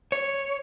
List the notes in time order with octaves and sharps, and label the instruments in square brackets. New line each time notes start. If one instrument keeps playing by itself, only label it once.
[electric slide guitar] C#5